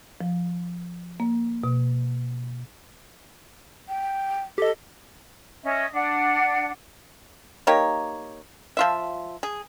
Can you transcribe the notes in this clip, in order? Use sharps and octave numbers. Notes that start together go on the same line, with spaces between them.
F3
A#3
B2
G5
G4 A4 D#5
C#4 D#5 E5
D4 F#5
A#3 D#4 G4 C#5
F3 F4 E5
G#4